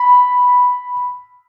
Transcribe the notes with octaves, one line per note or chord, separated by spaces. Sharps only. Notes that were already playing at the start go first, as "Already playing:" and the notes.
Already playing: B5